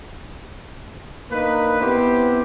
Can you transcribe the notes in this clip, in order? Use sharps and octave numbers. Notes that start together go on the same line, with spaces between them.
A#3 D4 D#4 B4
B3 C4 E4 G4 B4 C5